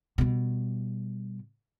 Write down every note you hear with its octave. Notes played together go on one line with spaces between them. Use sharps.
B2 G3